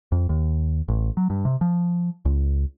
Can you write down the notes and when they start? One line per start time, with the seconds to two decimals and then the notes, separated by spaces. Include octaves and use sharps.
0.12 F2
0.29 D#2
0.88 A1
1.17 F#3
1.30 G2
1.45 C3
1.61 F3
2.25 C#2